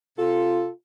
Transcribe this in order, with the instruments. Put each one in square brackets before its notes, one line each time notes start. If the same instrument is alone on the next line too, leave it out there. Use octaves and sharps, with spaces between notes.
[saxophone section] C3 A4 [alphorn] F4